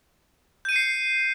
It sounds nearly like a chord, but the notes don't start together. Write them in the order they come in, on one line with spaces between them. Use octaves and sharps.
G6 D#7 C#7 C7